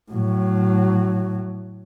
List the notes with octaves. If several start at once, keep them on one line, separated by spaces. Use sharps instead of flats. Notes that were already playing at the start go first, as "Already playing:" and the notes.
A2 F#3